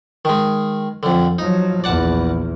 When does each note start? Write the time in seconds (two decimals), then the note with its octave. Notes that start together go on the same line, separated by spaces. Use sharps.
0.25 D#3 G#3
1.03 F2 D3 F3
1.39 F3 F#3 D#4
1.84 A#1 E2 D5 F#5 A5